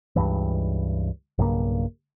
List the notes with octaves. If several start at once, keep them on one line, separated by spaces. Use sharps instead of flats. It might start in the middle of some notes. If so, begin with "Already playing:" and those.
C#2 G2 E3
B1 G2 C#3 A#3